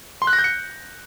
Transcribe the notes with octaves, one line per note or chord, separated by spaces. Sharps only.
C6
F#6
A#6
G6
C#7